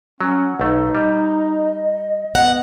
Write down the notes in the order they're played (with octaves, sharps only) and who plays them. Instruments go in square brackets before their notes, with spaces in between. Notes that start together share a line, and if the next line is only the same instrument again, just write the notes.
[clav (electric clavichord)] F#3 [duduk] C#4 [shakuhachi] F#5
[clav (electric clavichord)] B1 A3 [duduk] D#4
[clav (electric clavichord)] G3 [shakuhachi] D#5
[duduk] B3 [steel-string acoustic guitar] F#5 [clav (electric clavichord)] A#5